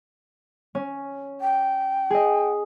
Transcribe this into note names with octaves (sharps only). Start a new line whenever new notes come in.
C#4
G5
G#4 D#5